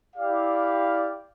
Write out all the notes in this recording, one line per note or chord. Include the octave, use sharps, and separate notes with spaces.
E4 G4 D5 F5